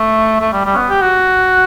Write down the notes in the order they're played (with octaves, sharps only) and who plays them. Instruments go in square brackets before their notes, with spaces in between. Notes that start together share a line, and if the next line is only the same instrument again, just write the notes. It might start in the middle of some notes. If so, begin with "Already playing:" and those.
Already playing: [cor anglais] A3
A3
G3
G3
C#4
B3
G4
F#4